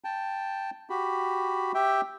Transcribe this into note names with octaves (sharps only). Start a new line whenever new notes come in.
G5 A5
F#4 G4 B5
G4 E5 G5